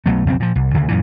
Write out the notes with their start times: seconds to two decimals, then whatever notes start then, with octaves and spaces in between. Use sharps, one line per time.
0.06 B1 B2 F#3 A3
0.26 B1 F2 C#3 C4
0.40 A#2 F3
0.55 C2
0.74 D2 C#3
0.88 F#2 A#2 E3